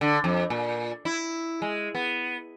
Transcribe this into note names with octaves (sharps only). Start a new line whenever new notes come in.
D3
F2
A#2
E4
G#3
B3